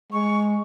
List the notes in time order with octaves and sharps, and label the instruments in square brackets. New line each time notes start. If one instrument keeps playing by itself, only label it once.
[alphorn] G#3 [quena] C#6